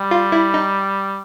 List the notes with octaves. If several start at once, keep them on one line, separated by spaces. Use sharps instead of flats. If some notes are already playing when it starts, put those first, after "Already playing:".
Already playing: G3
F4
E4
D#4